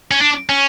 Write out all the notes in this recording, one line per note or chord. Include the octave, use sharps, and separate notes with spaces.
C#4
D4
C#4